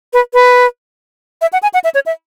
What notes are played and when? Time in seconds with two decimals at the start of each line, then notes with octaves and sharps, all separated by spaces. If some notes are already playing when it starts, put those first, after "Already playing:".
0.13 B4
0.34 B4
1.42 E5
1.53 F#5
1.63 G#5
1.74 F#5
1.84 E5
1.94 C#5
2.06 E5